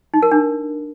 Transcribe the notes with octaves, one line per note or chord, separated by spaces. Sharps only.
D#4
A#4
D4